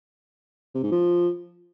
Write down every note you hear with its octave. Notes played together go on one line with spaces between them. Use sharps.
C3
G#2
F3